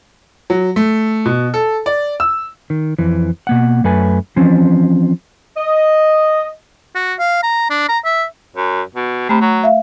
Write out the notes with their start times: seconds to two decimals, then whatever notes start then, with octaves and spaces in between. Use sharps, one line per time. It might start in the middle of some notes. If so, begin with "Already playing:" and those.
0.50 F#3
0.76 A3
1.25 B2
1.54 A4
1.86 D5
2.20 E6
2.70 D#3
2.99 F2 E3
3.47 B2 A#3 F#5
3.84 F#2 A3 B4 G#5
4.36 E3 F3 C4 C#4
5.57 D#5
6.95 F#4
7.19 F5
7.43 A#5
7.70 D4
7.89 A#5
8.05 E5
8.56 F#2
8.95 B2
9.29 C3 A3 B5
9.41 F#3
9.64 E5 F5